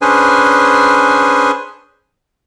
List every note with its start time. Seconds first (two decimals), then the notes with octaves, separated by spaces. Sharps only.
0.02 C#4 D4 G#4 B4 C5 G#5